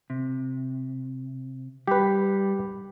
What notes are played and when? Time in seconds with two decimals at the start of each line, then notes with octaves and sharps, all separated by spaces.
0.10 C3
1.88 G3 G4 B4